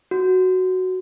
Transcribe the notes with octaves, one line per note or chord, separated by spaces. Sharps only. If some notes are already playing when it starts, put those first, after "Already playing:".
F#4